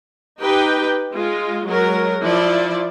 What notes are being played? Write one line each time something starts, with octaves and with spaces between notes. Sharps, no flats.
D#4 G4 B4 G5
G#3 F4
F#3 G#3 A#4
F3 E4 D5